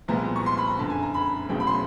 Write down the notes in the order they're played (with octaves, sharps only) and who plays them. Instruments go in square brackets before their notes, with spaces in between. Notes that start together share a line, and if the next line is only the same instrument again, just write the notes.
[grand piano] C2 A#2 F3 G#3 B3 A#5
C#6
C6
B5
A#5
F#1 F2 D3 A5
G#5
A#5
B5
E1 E2 C#3 F#3 A3 G5
B5
C6